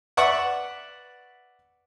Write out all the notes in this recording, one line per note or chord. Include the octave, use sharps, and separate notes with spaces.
B4 D5 E5 F#5 C#6